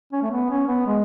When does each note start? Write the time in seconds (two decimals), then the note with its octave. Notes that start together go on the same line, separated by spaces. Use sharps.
0.13 C#4
0.23 A3
0.31 B3
0.50 C#4
0.68 B3
0.87 G#3